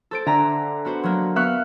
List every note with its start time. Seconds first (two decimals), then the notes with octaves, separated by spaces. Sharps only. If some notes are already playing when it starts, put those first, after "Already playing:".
0.11 A4 C5 D7
0.26 D3 E5 G#5 A#5
0.85 B3 F#4 C5
1.03 F#3 A#3
1.36 B3 E5 F5 C#6 F#6